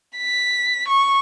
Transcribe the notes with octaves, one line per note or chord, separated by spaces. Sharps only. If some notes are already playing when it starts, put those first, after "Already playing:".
B6
C#6